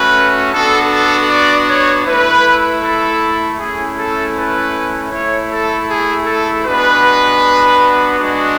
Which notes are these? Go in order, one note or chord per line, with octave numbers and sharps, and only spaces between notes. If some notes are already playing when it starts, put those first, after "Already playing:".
Already playing: A3 C#4 F#4 B4
B3 D4 F#4 A4
A4
D5
C#5
A3 E4 B4
A4
A3 C#4 E4 G#4
A4
B4
A3 E4 C#5
A4
G#4
A4
G#3 B3 D4 F#4 B4
G#3 D4 F#4